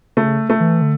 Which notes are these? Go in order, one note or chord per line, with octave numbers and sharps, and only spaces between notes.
C#3 A3
A3
E3
D3